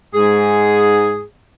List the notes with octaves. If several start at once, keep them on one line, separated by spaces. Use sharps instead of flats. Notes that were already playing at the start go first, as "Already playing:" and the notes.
G#2 G#4